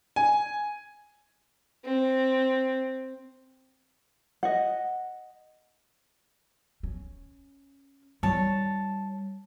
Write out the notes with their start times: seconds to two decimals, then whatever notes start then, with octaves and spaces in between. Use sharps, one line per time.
0.16 G#5
1.84 C4
4.43 D#5 F#5
6.83 C#4
8.23 G3 E4 C#5 A5